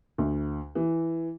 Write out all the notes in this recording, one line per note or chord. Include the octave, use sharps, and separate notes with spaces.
D2
E3